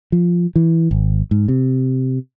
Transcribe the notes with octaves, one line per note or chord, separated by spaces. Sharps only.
F3
E3
G#1
G#2
C3